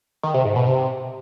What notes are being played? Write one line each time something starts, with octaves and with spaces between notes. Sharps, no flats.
D#3
C3
G#2
B2
C3